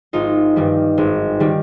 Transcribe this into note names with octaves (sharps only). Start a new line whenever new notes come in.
G#1 D#4 F4
G2 D#3 G3
G#1
D#3 G3